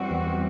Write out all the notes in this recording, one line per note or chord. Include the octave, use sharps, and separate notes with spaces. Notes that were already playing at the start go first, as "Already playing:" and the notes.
Already playing: F#2 E3 G3 C4 F#4
E2